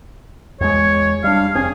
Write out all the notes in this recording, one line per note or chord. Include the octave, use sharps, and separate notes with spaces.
E2 G#3 C#5
G3 D4 F5
F1 C4 C#4 G#4